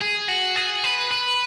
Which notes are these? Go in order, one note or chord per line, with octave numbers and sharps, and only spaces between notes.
G#4
F#4
G#4
B4
B4